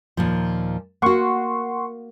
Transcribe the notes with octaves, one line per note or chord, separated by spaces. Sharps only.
D#2 A#2 F3
A#3 F#4 F#5 C6 C#6